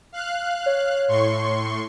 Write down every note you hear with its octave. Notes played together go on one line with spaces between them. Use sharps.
F5 F#6
C#5
A2 C6 C#6